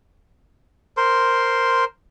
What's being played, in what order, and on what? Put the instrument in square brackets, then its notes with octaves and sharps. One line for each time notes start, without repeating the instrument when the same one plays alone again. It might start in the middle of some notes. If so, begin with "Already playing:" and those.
[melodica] A#4 C5 C6